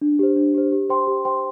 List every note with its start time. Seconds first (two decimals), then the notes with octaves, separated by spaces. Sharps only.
0.01 D4
0.19 G4 C5
0.36 D4
0.54 G4 C5
0.72 G4
0.90 C5 G5 C6
1.07 G4
1.25 C5 G5 C6